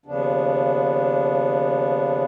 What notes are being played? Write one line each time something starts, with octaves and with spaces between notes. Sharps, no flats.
D#2 C#3 F3 B3 D4